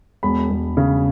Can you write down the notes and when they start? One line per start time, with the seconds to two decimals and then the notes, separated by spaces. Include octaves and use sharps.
0.23 E1 B5
0.50 E1
0.77 C#3